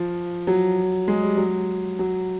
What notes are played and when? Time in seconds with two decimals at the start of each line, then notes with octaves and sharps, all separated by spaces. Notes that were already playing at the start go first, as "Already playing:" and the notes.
Already playing: F3
0.47 F#3
1.08 G#3
1.22 G3
1.37 F#3
1.99 F#3